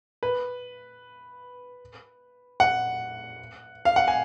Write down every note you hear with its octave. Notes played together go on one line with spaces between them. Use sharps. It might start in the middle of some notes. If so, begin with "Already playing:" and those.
B4
F#5
F5
F#5
G#5